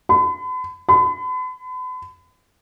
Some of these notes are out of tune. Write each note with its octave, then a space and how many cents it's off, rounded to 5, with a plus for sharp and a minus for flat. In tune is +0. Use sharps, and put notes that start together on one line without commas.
B5 +40
B5 +40